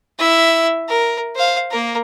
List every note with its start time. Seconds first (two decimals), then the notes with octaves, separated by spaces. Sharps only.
0.19 E4 E5
0.88 A#4
1.36 C5 F5
1.71 A#3 A#4